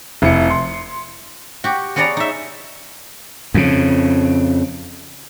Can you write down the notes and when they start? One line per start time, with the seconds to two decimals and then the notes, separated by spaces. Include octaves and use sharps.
0.22 F1 E4 C#7
0.50 C6
1.64 F#4 G4
1.96 B3 F#4 G#4 C#5 D5 A#5
2.17 D#4 E5
3.54 F2 C#3